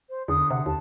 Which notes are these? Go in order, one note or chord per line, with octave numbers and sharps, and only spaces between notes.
C5
E2 D3 D#6
C3 F#5
D#2 A5